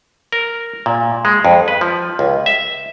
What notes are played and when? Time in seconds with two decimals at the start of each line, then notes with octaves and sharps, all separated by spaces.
0.32 A#4
0.86 A#2
1.25 G#3
1.45 F2
1.68 B4
1.81 F3
2.19 C#2
2.46 E5